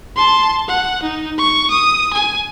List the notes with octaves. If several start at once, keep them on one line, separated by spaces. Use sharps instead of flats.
A5 C6
F#5
D#4
C#6
D#6
G#5